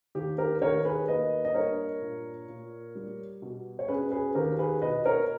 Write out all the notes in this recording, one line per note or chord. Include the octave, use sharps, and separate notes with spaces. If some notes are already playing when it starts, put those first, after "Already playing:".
D#2 G4
G4 A#4
D#2 A#4 C#5
G#4 B4
A#3 B4 D#5
D#5
G2 A#4 C#5
A#2
A#2
G3
B2
C#5
C#4 G#4 B4
G#4 B4
D#2 G4 A#4
G#4 B4
B2 B4 D#5
A#4 C#5